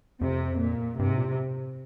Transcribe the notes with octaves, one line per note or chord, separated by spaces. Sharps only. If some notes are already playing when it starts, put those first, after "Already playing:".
F2 C3
A#2
G2 C3
G#2
A#2